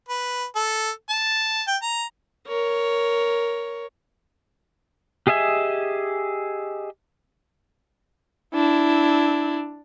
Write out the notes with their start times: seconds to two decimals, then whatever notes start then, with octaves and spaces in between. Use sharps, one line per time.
0.09 B4
0.56 A4
1.10 A5
1.68 G5
1.82 A#5
2.48 A#4 C#5
5.27 G4 G#4 D#5 E5 G#5
8.54 D4 E4